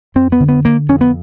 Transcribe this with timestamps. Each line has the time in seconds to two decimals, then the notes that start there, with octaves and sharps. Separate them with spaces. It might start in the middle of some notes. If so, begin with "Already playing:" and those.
0.15 F2 C4
0.32 B3
0.40 D3
0.49 B3
0.65 D3 A#3
0.89 F2 C#4
1.01 B3